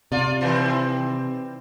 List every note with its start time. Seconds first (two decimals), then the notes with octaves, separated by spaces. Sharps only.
0.12 C3 F4 D5
0.41 D#3 E3 C4